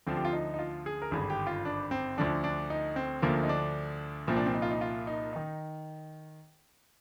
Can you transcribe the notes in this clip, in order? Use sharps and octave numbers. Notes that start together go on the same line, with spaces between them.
D2 D3 F3 C4
G4
F4
D#4
D#4
F4
G#4
A#4
G#1 G2 D3 G#4
G4
F4
D4
C4
D2 D3 F3 D4
D4
D#4
C4
D2 D3 F3 A#3
D#4
D4
C2 A#2 F3 C4
D4
C4
D#4
F4
D#4
F4
D#4
D#3 D#4